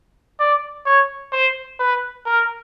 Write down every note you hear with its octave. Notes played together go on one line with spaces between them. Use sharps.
D5
C#5
C5
B4
A#4